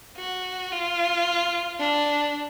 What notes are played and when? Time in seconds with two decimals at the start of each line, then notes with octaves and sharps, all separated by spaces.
0.18 F#4
0.72 F4
1.80 D4